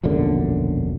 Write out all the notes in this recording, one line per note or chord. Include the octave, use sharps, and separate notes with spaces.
E1 A#1 F#2 D3